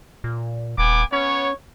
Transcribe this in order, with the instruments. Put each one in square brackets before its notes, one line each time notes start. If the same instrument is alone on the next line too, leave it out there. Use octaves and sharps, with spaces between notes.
[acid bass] A#2
[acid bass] D#1 [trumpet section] B3 G#5 D6
[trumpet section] B3 C#5 [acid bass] C#4